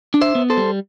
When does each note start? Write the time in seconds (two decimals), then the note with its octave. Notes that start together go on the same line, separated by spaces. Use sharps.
0.14 D4
0.21 C5 E5
0.35 B3
0.50 A4 C5
0.57 G3